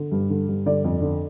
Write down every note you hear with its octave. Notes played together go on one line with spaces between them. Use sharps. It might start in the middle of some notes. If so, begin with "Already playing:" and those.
Already playing: D3
G2
D3
G2
D3 D5
F2
D3